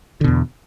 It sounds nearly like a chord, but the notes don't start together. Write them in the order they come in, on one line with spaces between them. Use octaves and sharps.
D3 B2 E2